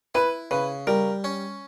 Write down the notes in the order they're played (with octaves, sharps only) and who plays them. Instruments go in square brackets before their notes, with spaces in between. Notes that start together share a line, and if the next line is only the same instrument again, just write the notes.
[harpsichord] E4 [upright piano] B4
[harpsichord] C#3 [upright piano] B4
[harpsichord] G3 [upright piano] A#4
[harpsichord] C#4